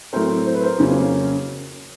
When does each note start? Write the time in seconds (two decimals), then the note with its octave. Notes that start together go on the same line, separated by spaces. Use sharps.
0.13 A2 F#3 A3 C4 A#4 C5
0.46 C5
0.54 B4
0.63 A#4 C5
0.78 F2 C#3 F#3 A#3 C#4